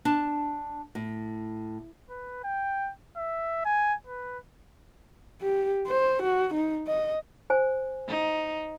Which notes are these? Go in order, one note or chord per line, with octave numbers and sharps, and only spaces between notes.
D4 A5
A2
B4
G5
E5
G#5
B4
G4
C5
F#4
D#4
D#5
C5 G#5
D#4